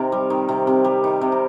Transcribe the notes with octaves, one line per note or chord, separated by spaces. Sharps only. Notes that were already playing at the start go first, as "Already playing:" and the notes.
Already playing: C3 D#3 A#4
G3
D#3
C3
C3
G3
D#3
C3
A#4